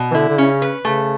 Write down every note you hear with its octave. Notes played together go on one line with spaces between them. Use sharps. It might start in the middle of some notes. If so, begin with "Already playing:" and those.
Already playing: B2
E3
D3 E4
D3
C#3 C#4
B4
C#3 A3